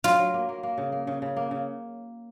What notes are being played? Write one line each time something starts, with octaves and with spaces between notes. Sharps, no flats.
F#3 F4
F#3
A#3
A#3
A#3
C#3
A#3
C#3
C#3
A#3
C#3